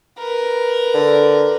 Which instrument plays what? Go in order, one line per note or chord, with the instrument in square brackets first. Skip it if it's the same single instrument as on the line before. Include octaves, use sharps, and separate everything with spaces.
[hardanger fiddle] A#4 B4
[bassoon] D3